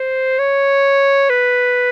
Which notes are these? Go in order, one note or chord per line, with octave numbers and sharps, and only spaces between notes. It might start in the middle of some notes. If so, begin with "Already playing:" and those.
Already playing: C5
C#5
B4